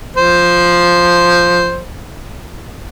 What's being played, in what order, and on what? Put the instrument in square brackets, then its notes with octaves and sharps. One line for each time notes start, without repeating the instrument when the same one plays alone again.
[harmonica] F3 C5